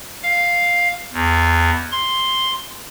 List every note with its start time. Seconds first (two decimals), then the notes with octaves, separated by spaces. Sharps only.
0.23 F5
1.13 E2
1.92 C6